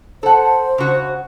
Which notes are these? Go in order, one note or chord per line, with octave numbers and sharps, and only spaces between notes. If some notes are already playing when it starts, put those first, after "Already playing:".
A4 C5 F#5
C#3 F#4